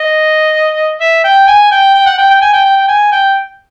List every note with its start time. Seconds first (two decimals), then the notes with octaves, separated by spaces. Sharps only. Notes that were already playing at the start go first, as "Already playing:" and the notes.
Already playing: D#5
1.01 E5
1.24 G5
1.48 G#5
1.71 G5
1.94 G5
2.06 F#5
2.18 G5
2.30 G5
2.41 G#5
2.53 G5
2.65 G5
2.77 G5
2.88 G#5
3.12 G5